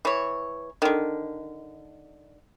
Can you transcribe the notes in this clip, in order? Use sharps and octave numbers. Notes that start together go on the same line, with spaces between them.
E3 C#5
D3 D#3